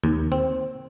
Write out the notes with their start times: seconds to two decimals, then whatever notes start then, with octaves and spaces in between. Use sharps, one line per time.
0.04 D#2
0.32 C4